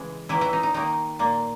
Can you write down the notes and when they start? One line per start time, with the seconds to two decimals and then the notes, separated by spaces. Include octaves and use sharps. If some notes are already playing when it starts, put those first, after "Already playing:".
Already playing: C#3 E3 G#3
0.29 D#3 E3 A#3 E4
0.41 E3 E4
0.53 D#4
0.63 D#4
0.74 D#3 A#3 D#4
1.19 A#2 A#3